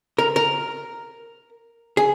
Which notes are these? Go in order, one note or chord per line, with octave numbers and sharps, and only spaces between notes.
A#4
A#4
G#4